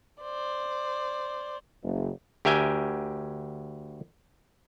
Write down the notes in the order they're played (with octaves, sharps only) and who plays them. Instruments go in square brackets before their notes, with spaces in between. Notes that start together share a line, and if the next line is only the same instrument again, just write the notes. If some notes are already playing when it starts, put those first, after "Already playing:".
[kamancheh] C5 D5
[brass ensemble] F#1
[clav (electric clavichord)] D2 G4 A#4 E5 G5 G#5